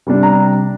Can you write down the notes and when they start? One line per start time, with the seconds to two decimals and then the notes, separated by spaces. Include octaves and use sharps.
0.07 C3 G3 D4
0.23 A#5